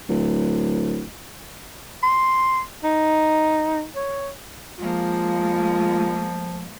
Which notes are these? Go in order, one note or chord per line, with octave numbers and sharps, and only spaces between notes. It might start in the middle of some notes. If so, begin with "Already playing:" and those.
D1
C6
D#4
C#5
F3 G#3 A#3 F4